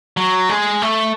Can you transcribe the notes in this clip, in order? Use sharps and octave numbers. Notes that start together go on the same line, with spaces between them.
F#3
G#3
A3